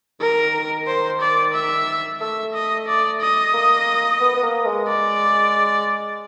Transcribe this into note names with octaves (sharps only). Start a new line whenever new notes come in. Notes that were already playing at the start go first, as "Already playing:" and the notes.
D#3 A#4
D#3
C5
D5
E5
A3 E5
D#5
D5
D#5
A#3
B3
B3
A#3
G#3
D5